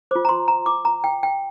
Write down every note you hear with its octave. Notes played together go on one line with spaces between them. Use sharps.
F4 C5 D6
A#5
C6
A#5
D6
A#5
G5
G5